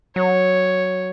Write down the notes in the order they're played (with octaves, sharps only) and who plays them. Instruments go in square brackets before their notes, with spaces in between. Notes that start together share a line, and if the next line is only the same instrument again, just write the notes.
[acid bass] F#3 [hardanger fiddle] C#5